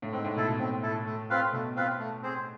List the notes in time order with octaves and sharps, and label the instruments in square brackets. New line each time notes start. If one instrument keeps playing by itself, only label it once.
[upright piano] A2
[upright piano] G#2 [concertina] C4
[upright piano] A2
[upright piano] B2 [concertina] E4 A4
[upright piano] B2
[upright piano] A2 [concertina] C4
[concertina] E4 A4
A3
C4 F4 B4 F5
[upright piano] B2 [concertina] A3
[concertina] C4 F4 B4 F5
A3
C4 G#4 C5